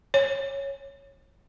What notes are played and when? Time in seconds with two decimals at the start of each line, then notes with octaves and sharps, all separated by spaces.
0.14 C#5